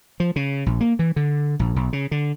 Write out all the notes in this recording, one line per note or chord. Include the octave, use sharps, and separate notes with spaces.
F3
C#3
A#1
A#3
E3
D3
A#1
B1
C#3
D3